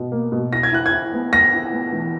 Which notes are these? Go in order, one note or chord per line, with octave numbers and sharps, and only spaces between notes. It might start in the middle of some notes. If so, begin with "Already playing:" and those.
Already playing: B2
A#3
B2
E4 A#6
G#6
E4 F#6
G#6
E4
B3
B3 A#6
E4
B3
E3